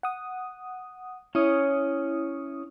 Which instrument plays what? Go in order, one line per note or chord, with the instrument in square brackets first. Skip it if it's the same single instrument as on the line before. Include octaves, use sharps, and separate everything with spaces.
[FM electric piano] F#5 D#6
[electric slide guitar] C#4 C#5 [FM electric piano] E4 D#6